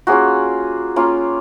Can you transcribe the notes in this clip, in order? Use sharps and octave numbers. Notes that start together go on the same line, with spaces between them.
A#3 C#4 F4 F#4 G#4
A#3 C#4 F4